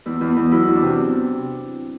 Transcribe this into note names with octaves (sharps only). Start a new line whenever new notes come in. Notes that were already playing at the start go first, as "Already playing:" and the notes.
E2 E4
E2
E2
F#3 E4
E2
D4
C3